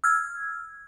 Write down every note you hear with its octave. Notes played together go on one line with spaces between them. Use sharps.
E6 F6 G#6